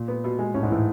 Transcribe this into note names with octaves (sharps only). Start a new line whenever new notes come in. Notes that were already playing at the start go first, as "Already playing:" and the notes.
Already playing: A#2
B3
B2
G#3
A2 C#4
G#2
A2 E3